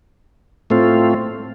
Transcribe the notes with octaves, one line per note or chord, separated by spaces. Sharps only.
A2 A3 C4 F4